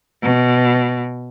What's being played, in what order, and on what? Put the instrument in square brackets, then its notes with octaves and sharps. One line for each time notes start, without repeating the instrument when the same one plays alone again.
[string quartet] B2